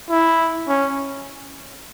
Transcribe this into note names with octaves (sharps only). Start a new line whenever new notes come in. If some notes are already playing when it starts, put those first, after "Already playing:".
E4
C#4